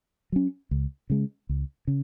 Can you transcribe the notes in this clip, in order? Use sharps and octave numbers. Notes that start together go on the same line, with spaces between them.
F#3 C#4
C#2
C#3 G#3
C#2
C#3